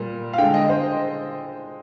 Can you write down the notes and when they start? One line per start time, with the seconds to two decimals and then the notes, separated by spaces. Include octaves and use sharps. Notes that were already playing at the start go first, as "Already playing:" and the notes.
Already playing: A#2 G3
0.33 F5
0.38 D3 G#3 G5
0.54 D#5
0.70 C5